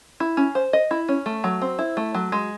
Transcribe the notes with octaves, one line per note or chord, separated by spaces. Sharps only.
E4
C#4
C5
D#5
E4
C#4
A3
F#3
C4
E4
A3
F#3
G#3